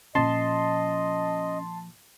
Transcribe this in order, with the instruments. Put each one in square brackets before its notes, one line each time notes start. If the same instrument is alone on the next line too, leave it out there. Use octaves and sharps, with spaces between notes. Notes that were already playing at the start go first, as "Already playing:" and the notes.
[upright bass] A#2 F3 [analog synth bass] C#4 [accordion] D#5 [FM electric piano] A5 C6